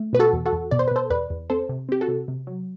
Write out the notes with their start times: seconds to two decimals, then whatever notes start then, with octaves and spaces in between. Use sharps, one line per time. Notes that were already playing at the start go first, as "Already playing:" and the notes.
Already playing: A3
0.13 B2 B4
0.19 F#4 A4
0.33 E2
0.45 F#4 A4
0.53 E2
0.71 B2 D5
0.79 C5
0.88 B4
0.91 B2 A4 C5
1.10 E2 B4 D5
1.30 E2
1.50 C4 A4 C5
1.69 C3
1.89 C4 G4
2.01 F#4 A4
2.08 C3
2.28 C3
2.47 F#3